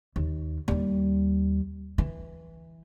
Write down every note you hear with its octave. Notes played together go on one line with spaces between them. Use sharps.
D#2
D#2 G3
E3